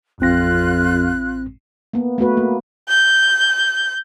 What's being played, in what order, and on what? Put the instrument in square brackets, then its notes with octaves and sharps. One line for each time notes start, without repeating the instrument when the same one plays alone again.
[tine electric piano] A1 C4 A#6 [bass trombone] F2 [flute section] F4 F#6
[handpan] A#3 B3
A3 B3 F#4 B4
A#3
[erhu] G6